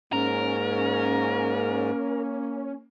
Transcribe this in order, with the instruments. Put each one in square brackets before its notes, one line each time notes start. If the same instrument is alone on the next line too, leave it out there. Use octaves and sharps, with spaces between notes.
[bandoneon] G#2 [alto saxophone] A#3 [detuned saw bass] C#4 [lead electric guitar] A#4